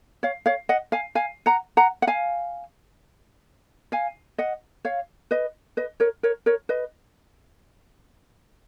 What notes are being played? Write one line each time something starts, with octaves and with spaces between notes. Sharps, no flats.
C#5 F5
C#5 F5
D#5 F#5
F5 G#5
F5 G#5
F#5 A#5
F#5 A#5
F#5
F5 G#5
F5 G#5
D#5 F#5
C#5 F5
B4 D#5
B4 D#5
A#4 C#5
A#4 C#5
A#4 C#5
B4 D#5